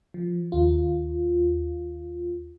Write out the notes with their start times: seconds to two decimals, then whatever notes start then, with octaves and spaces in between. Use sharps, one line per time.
0.14 F3
0.52 D#2 F4